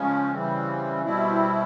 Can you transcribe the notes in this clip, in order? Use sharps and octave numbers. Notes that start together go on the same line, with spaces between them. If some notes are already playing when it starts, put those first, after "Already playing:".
Already playing: C#3 F3 G#3 C#4
C#3 E3 G3 C4
B2 G3 C4 E4